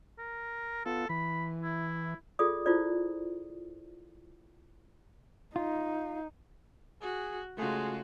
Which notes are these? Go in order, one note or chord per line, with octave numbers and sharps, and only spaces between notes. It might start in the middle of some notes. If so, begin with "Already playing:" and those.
A#4
B3 F4 A4
E3 B5
E4
F4 G#4 A4 D5 D#6
E4 F4 C5 D5
D#4 F4
F#4 G#4
C#3 G#3 A3 F4 F#4 G#4